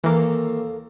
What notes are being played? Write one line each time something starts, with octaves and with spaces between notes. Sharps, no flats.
D#2 E3 A#3 A4 A#4 F5